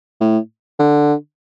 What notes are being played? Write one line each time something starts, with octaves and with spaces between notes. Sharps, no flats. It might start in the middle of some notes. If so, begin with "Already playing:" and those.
A2
D3